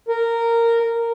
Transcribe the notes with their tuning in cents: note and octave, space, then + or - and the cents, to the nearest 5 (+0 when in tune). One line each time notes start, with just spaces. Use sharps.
A#4 -10